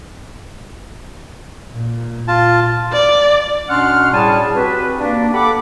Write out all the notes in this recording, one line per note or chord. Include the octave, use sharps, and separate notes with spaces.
A#2
F4 A5
D5
B2 C#4 D4 F#5 C6 F6
A2 G3 G#4 G#5 A5
C4 F#4 G4 B4
A#3 D4
G4 A4 F#5 B5 D6